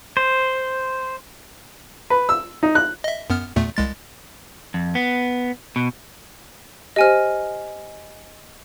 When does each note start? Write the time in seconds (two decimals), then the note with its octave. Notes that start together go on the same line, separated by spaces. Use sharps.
0.17 C5
2.10 B4
2.29 E6
2.63 D#4
2.75 F#6
3.04 D#5 E5
3.30 F#2 B3 F6
3.56 E2 A#2 A3
3.77 C2 G#3 A6
4.74 F2
4.95 B3
5.76 B2
6.96 G4 C5 D#5 G#5 F6